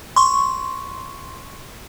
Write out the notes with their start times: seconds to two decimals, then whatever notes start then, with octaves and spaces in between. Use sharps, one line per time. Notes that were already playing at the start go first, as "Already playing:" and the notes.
0.16 C6 C#6